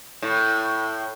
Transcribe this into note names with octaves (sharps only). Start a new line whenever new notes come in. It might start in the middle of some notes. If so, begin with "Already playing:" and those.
A2